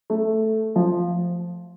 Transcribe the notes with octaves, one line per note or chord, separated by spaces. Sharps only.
A3
F3